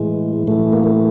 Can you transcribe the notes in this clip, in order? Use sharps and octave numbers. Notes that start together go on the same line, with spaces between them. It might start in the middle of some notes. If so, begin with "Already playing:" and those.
Already playing: A2 E3 G#3
A2 E3 A3
A#3
A3